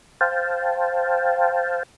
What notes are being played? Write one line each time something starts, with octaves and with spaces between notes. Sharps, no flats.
C5 F5 G5 A5